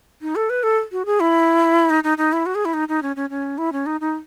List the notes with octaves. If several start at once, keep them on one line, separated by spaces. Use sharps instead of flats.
D#4
A4
B4
A4
F#4
G#4
E4
D#4
D#4
D#4
E4
F#4
G#4
E4
D#4
D#4
C#4
C#4
C#4
E4
C#4
D#4
D#4